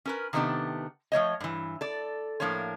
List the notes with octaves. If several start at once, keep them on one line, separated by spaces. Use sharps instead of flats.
C#4 A#4 B4
C3 D#3 A3 B3 D4 G4
F3 A3 C#5 D#5
G2 E3
A4 D5
A2 F3 A#3 D4 C#5